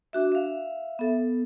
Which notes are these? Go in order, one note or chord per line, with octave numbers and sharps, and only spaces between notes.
D4 F#4 E5
E5 F5
B3 A4